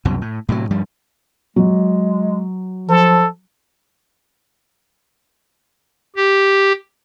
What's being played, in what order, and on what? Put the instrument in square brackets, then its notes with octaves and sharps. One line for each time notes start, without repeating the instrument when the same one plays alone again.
[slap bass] C2 F#2 B2
A2
A2 C3 E3 F#3
G2 F3 G3
[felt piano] F#3 [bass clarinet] G#3
[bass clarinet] F3 [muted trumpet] A4
[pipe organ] G4